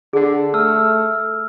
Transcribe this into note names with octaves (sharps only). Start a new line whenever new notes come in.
D3 G#4 F#5
A3 A5 E6 F6